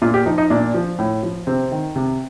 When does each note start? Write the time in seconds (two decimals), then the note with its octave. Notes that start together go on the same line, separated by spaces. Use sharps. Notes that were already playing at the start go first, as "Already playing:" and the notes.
0.02 A#2 F4
0.14 G4
0.26 F3 D#4
0.38 D#4
0.50 A#2 D4
0.74 F3
0.99 A2
1.23 F3
1.47 C3 C4
1.71 D#3
1.96 C3